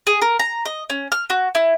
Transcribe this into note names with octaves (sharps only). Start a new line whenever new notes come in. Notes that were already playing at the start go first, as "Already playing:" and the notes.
G#4
A#4
A#5
D#5
C#4
F6
F#4
E4